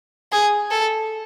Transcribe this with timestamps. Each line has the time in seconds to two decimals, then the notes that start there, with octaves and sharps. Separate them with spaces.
0.32 G#4
0.71 A4